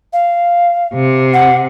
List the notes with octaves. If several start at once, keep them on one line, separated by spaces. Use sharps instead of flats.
F5
C3
F#5